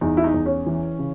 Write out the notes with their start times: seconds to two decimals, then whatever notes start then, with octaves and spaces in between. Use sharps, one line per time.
0.01 E2 D#4
0.17 E4
0.24 D#4
0.34 E2
0.46 C#4
0.66 E3
0.99 C#3